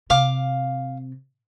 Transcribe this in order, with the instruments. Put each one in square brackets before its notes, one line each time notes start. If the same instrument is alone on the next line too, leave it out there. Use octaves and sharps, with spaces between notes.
[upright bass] C3 [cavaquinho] F5 D6